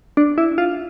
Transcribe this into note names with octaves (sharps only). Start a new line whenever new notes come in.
D4
E4
F4